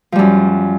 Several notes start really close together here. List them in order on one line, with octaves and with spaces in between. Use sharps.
F3 G3 F#2